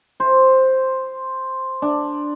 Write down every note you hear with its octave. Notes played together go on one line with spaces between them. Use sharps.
C5
D4